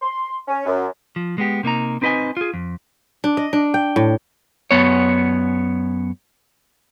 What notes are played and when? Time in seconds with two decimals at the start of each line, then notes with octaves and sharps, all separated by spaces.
0.02 C6
0.48 C#4
0.66 F#2
1.16 F3
1.38 G#3 B3 G4
1.63 C3 A#3 D#4 A#5
2.02 C4 D#4 B4 D5 D#5 G#5
2.37 F4 G#4
2.54 F2
3.24 D4
3.37 D#5
3.53 D4
3.74 G5
3.96 A2
4.71 F#2 B3 C#5